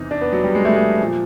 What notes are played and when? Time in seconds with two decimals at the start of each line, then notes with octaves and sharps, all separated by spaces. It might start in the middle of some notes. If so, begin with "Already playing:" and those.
Already playing: E2 C3 E3 D#4
0.11 D4
0.21 B3
0.33 F#3
0.44 G3
0.55 G#3
0.65 A3
0.75 G#3
0.99 A#2 F3